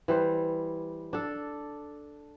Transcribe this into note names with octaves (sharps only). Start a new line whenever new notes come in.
E3 G3 C5
D4 A4